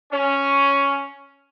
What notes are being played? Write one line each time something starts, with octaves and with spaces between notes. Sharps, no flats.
C#4